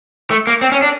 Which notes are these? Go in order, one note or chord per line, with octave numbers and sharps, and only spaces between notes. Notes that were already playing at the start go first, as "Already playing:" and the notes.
A3
A#3
C4
C#4
D4